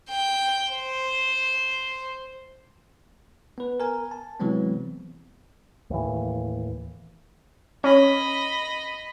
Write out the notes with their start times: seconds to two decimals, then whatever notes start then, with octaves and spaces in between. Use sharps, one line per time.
0.10 G5
0.72 C5
3.58 B3 B4
3.80 A#4 G#5
4.11 A5
4.40 C3 E3 F#3 G#3 B3 C4
5.90 D#2 A2 E3
7.84 C#4 D#5 B5